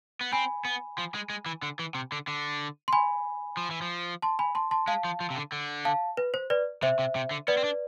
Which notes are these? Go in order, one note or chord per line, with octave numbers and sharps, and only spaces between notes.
B3
C4 G#5 B5
B3
F3
G#3
G#3
E3
D3
E3
C3
D3
D3
C6
G#5 B5
F3
E3
F3
A5 C6
G#5 B5
A5 C6
A5 C6
G#3 F5 A5
F3
F3
C3
D3
D3
F5 A5
B4
C5
B4 D5
C3 C5 E5
C3
C3
D3
B3 B4 D5
C4
D4